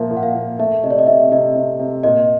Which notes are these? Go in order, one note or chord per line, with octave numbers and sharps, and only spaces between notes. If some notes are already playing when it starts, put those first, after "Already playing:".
Already playing: A#2 F3 A#3 E5
A#2
F#5
F5
A#2
A3 E5
C3 D#5
D5
D#5
C3 E5
C3 D#5
C3
C3
A#2 D#5